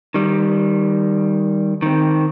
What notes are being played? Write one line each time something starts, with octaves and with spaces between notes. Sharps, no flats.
D#3 G3
D#3 C4